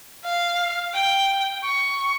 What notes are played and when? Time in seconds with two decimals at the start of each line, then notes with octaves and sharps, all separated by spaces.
0.25 F5
0.94 G5
1.63 C#6